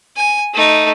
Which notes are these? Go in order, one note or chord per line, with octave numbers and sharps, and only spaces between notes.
G#5
A3 D#4